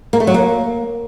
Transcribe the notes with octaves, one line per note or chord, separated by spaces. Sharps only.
A#3
A3
F#3
A#3